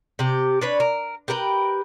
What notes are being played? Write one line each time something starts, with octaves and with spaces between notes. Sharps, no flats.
C3 G4
D4 B4 C#5
A#4
G4 A#4 B4 G5